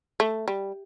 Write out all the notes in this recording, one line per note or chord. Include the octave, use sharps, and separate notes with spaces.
A3
G3